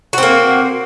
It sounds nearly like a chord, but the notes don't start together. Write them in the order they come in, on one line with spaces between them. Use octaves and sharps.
F#4 C4 A#3